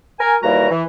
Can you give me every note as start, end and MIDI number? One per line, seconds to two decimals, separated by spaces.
0.19 0.35 70
0.19 0.35 80
0.43 0.69 39
0.43 0.69 52
0.43 0.69 55
0.43 0.69 58
0.43 0.69 66
0.43 0.69 82
0.69 0.84 52